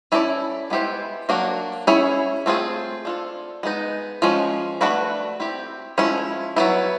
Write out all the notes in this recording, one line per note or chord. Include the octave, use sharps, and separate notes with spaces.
C#4 E4 A4 D5
G#3 B3 E4 G4 C5
F#3 A#3 D4 F#4
C#4 E4 G#4 C#5
A3 C4 F4 G#4
D4 F4 A4
G#3 B3 D#4
F3 G#3 C#4
A3 D4 F#4 B4 D5
C4 E4 G4
F3 G#3 C#4 E4
F#3 B3 E4